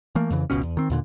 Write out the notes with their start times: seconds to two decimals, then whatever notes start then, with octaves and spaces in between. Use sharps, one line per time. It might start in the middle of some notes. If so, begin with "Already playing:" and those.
0.15 E3 A3 A#3
0.30 F2 C#3 E3
0.50 F#1 C#2 B2 C#4
0.63 E2
0.77 D#3 C4
0.90 D#2 A#2 D3